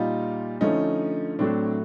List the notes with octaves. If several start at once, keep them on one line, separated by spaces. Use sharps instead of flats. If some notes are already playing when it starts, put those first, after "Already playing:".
Already playing: A#2 G3 D#4 F4
D3 F3 A3 C#4 D#4
A2 F#3 A3 C4 D4